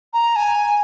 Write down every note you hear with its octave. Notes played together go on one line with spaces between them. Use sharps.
A#5
G#5